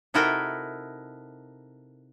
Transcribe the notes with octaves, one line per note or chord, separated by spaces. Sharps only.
C3 D#4 E4 F#4 A4 A#4